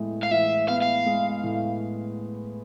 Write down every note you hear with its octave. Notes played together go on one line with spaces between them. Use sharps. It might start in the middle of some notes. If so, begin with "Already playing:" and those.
Already playing: A2 G#3 B3
F5
E3 E5
B3 F5
F5
G#3
A2